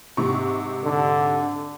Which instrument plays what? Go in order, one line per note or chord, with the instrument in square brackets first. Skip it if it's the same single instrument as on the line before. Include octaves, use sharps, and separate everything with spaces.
[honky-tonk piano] G#2 C3 C#6
[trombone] D3